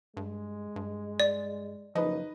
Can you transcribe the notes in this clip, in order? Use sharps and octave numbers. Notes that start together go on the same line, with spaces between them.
G2 G#3
G2
D5
F#1 F3 D#4 B4 D#5